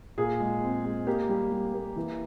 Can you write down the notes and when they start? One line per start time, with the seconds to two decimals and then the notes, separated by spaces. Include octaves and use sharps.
0.18 A#2 G#4
0.40 G#3
0.63 C4
0.84 G#3
1.07 A#3 G4
1.29 G3
1.52 G3
1.74 A#3
1.96 E3